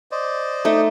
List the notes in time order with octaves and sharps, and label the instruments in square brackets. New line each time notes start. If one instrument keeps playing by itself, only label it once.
[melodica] C5 D5 D#5
[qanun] A3 D#4